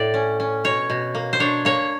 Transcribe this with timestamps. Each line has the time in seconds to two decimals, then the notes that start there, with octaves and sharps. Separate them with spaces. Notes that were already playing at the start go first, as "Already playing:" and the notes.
Already playing: A2 D5
0.14 C#4
0.40 C#4
0.64 B2 C#5
0.90 B2
1.15 A#3
1.33 C5
1.40 D4 C#5
1.65 A#3 C#5